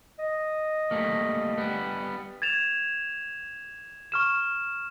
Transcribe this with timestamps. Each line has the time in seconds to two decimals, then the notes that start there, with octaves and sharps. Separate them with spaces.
0.19 D#5
0.91 G3 A3 A#3
1.58 G3 B3
2.42 G#6 A6 E7 F7
4.12 C#6 F6 E7